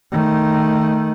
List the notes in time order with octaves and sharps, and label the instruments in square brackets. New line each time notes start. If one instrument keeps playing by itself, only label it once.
[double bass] D#3 A3